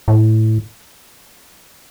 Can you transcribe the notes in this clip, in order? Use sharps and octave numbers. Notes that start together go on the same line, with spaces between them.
A2